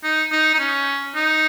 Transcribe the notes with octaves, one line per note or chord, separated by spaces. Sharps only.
D#4
D#4
D#4
C#4
D#4